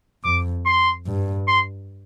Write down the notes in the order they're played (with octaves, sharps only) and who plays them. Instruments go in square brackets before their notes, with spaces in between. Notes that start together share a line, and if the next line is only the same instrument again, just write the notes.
[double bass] F2 [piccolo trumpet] D6
[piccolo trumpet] C6
[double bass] G2
[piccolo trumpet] C6